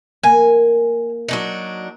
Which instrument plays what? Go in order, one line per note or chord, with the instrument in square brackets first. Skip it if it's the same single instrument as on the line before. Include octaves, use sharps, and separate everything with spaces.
[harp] A#3 [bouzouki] G#5
[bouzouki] F#3 D4 D#4